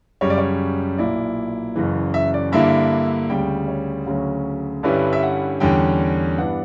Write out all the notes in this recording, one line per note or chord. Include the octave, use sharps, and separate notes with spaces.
F#2 C#3 G3 C#5
D5
C#5
B1 A#2 A#3 E4 D5
F#1 F#2 C#3 E3
E5
D5
G2 D3 A#3 E4 E5
D2 C#3 G3 G5
C#5
D2 C#3 F#3
G2 D3 G3 C#4 E4 B4
E5
F#5
E2 D3 G3 C#4 G5
G2 E3 B3 D4 F#5